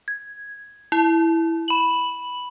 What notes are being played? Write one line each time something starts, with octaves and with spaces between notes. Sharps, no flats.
G#6
E4
B5 F#7